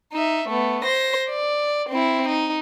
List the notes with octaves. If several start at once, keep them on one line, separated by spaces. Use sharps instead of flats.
D#4 E5
A3 B3
C5 A#6
D5
C4 E4
D#4